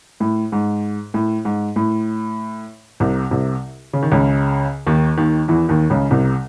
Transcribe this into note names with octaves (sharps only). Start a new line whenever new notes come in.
A2
G#2
A2
G#2
A2
C2 C3
C2 C3
C#3
D#3
C#2 C#3
D#2 D#3
D#2 D#3
E2 E3
D#2 D#3
C#2 C#3
C2 C3